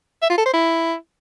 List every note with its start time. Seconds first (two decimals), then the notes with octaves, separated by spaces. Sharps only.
0.22 E5
0.30 F4
0.38 A4
0.46 C5
0.53 E4